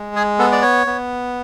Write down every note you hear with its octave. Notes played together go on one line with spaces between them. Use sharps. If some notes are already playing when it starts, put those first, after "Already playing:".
Already playing: G#3
G#4
B3 A4
D5
C#5
B3